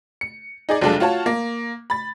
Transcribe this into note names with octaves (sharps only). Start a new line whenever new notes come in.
C#7
D#4 G#4 D5
F1 F#3 G#3 D4 F4 A4
F4 F#4 C#5 A5
A#3
B5 A6